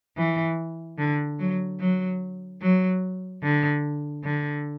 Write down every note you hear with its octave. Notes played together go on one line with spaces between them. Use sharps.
E3
D3
F#3
F#3
F#3
D3
D3